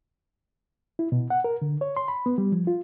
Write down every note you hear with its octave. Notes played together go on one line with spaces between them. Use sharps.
E4
B2
F#5
A#4
D3
C#5
C6
B5
B3
G3
F3
F4